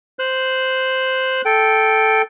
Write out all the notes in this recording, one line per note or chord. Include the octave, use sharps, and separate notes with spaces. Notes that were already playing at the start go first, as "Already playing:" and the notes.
C5 F#6
A4 G5